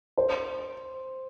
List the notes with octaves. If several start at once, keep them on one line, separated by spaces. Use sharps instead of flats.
C5